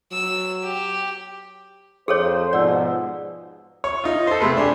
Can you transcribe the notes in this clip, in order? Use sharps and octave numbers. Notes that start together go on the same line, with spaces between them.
F#3 E6
G4
F2 G#4 A4 C5 C#5
G#2 B2 F3 D5 F#5 E6
C#5
D#4 F4
A4 C5
C3 G#3 A3 B4
D4 G4 G#5